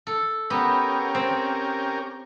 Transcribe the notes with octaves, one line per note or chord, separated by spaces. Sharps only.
A4
B3 C#4 G4 A#4
C4